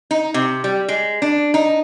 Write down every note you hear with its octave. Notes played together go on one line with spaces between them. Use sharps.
D#4
C3
G3
G#3
D4
D#4